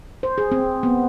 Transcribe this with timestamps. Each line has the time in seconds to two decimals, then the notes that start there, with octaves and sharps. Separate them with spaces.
0.23 C5
0.38 G#4
0.52 C4
0.83 B3